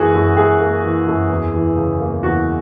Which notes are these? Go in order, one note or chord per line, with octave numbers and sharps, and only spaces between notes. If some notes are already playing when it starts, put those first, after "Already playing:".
Already playing: F#2 E3 A#3 F#4 G#4
F#2
F#2 G#4
A#3
E3
F#2
E2
E3
C#3
A#3
E2 F#4